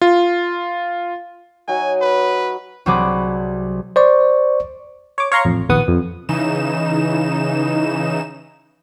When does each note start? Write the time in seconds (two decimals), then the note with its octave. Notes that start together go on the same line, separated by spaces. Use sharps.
0.02 F4
1.68 F#3 D#4 F#5 G#5
2.01 B4
2.86 C2 F#3 C4 G#4 B5 D6
3.96 C5 D5 C#6
5.18 C#5 D6
5.32 C#5 F5 A#5 C6 C#6
5.45 A1 F2
5.69 A#1 D#2 B3 F#5 D#6
5.88 F2
6.29 C#3 E3 D#4 E7